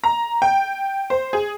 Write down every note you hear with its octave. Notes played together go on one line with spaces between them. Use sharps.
A#5
G5
C5
G#4